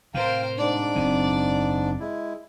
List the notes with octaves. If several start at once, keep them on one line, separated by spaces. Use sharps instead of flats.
A2 C3 A#4 C5 F5 G5
G#2 D4 D5
F#1 B2 C4
G#3 E4